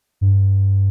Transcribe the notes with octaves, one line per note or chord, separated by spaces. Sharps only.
G2